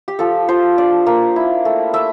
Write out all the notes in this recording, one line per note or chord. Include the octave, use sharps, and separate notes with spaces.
G4
F3 A4
F3 C5
D4 D5
A#3
E4
A3
A3 E5